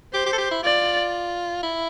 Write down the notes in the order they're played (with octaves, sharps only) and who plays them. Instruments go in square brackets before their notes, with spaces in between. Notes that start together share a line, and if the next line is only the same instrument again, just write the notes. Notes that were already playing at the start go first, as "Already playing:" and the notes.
[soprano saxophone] G4 [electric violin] C5
[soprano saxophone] G4
A4
G4
E4
[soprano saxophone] F4 [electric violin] D5
[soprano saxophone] E4